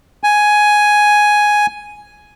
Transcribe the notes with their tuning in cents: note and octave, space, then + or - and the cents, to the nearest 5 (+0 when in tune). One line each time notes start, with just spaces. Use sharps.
G#5 +5